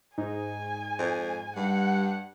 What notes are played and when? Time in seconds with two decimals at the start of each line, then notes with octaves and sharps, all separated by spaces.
0.18 G#2 D#4 G#5
0.99 F2
1.56 G2 G3 F#5